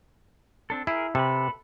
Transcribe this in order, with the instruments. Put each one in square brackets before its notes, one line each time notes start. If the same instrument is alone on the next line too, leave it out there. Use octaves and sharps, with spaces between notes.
[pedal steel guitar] C4 D4 A4
[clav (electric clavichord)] E4 [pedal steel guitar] G#4 A#4
[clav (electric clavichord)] C3 [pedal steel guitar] A4 B4 B5